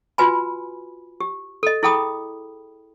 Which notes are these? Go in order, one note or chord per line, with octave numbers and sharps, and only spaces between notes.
F4 F#4 B4 G#5 B5
G4
A4 D#5
E4 G#4 A4 G5 B5 D#6